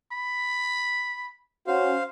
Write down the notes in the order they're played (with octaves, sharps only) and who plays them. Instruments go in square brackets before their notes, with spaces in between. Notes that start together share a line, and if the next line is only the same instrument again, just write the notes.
[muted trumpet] B5
[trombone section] C#4 F#4 [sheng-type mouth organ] C5 F5